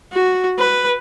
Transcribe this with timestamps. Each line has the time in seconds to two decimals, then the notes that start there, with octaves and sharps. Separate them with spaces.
0.13 F#4
0.59 B4